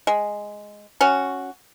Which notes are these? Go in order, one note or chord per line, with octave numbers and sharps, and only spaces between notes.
G#3
C#4 F#4